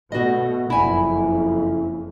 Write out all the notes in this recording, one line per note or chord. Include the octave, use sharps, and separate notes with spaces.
B2 A3 F#4 D#5
F#1 F2 E4 G#5